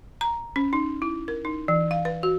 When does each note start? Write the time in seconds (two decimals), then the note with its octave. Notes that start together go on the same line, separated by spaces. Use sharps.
0.21 A#5
0.56 C#4
0.73 D#4
1.02 E4
1.28 A#4
1.45 D#4
1.68 E3
1.91 F5
2.05 B4
2.23 F#4